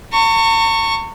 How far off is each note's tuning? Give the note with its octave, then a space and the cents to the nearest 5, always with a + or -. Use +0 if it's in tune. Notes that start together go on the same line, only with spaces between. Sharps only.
A#5 -45 C#6 +0